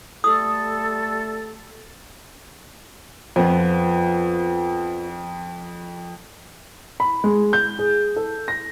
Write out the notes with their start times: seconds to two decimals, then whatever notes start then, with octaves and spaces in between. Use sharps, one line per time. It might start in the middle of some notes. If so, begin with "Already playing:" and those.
0.24 G3 A3 A4 D#6
3.36 F2 F3 B3
7.00 B5
7.24 G#3
7.53 G6
7.79 G#4
8.16 A4
8.48 A#6